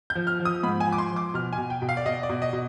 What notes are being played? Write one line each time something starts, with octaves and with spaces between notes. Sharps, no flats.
G6
F3
F6
F3
D#6
G#2 B5
G#5
F3
D6
C6
F3
D6
B2 F6
G#5
B2
G5
B2
F5
D5
B2 D#5
D5
B2
D#5
B2